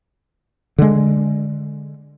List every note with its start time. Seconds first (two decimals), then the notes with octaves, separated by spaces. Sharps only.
0.78 D3 G#3